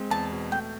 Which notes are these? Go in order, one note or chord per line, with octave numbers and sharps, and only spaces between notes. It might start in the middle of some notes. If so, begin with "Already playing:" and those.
Already playing: G#3 C4
E2 A5
B2
A3 G5